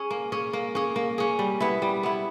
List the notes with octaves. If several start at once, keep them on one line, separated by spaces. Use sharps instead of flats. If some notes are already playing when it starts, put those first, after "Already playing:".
Already playing: C#4 G#4
A#3
C#4 G#4
A#3
C#4 G#4
A#3
C#4 G#4
G3
B3 E4
G3
B3 E4